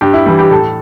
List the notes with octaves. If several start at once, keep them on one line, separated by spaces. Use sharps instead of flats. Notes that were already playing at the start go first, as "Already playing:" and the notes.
G2 G4
E4
E3 G3
G4
A2 A4